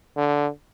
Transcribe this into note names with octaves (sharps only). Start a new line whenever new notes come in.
D3